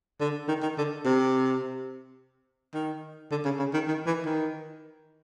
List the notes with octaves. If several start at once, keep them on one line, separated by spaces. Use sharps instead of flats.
D3
D#3
D#3
D3
C3
D#3
D3
C#3
C#3
D#3
D#3
E3
D#3